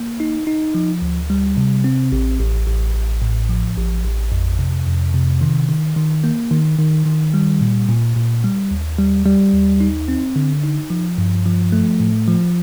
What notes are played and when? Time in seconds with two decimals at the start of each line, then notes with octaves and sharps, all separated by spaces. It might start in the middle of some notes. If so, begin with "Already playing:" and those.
Already playing: A#3
0.20 D#4
0.47 D#4
0.75 F3
1.02 D2
1.30 G3
1.57 C3
1.84 C4
2.12 A1
2.40 A1
2.67 A1
2.95 A1
3.22 A2
3.49 F3
3.77 A1
4.04 A1
4.32 F2
4.59 C3
4.86 F2
5.14 C3
5.41 D#3
5.69 D#3
5.97 D#3
6.24 A#3
6.51 D#3
6.79 D#3
7.06 D#3
7.34 G3
7.61 A#2
7.89 A#2
8.16 A#2
8.44 G3
8.71 D#2
8.98 G3
9.26 G3
9.53 D#2
9.80 D#4
10.08 C4
10.36 D3
10.63 D#4
10.90 F3
11.18 G2
11.46 F3
11.72 A3
12.00 A2
12.28 F3